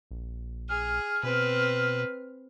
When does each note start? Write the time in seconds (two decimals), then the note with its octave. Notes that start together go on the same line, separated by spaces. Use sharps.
0.11 A#1
0.69 G#4 F6
1.23 B2 C4 B4